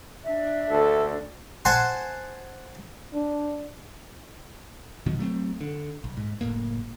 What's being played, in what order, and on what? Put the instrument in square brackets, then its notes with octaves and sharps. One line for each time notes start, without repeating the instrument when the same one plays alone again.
[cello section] D4 [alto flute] E5
[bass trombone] D2 [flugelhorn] A4
[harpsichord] C5 F#5 G#5 A5 C6
[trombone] D4
[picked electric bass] E1 B2 D#3 F#3
F#3 A3 A#3 C4
D3
B1
G#2
F#1 F#2 A2 A#3